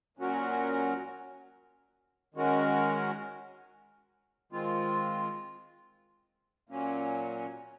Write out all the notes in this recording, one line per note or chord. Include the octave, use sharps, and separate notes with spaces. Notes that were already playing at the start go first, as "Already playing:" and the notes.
A#2 F#3 C#4 F#4 A#4
D#3 G#3 C#4 F#4 A#4
D#3 G#3 C4 F4
A#2 F#3 A#3 C#4